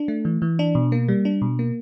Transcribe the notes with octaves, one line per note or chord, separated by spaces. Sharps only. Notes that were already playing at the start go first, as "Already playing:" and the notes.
Already playing: D4
A3
E3
E3
D4
B2
A#3
G3
D4
B2
A#3